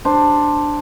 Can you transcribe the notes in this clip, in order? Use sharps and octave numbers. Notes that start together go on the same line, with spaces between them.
D4 C5